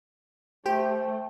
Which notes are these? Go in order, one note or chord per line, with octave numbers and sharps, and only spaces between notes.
A3 G4 C5 G5